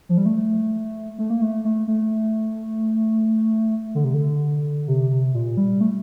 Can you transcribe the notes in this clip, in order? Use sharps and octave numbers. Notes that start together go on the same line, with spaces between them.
F3
G3
A3
A3
A#3
A3
A3
A3
D3
C3
D3
C3
C3
A#2
G3
A3